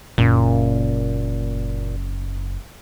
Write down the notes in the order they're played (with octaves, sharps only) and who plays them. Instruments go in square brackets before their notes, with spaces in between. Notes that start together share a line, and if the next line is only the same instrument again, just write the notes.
[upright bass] F#1 [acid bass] A#2